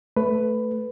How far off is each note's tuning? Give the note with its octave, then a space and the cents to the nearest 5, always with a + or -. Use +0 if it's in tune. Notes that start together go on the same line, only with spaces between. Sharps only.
A3 +0 B4 +10